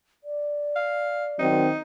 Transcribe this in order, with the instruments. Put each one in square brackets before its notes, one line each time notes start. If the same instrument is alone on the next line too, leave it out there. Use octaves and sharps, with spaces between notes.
[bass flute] D5
[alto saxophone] F5
[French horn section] D#3 F#3 C4 [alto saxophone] D#4